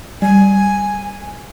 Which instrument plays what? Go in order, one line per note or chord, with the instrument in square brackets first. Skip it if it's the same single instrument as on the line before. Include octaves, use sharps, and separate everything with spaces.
[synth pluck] G3 [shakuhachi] G#5